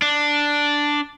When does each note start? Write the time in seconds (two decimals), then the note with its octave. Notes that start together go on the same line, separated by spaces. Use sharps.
0.02 D4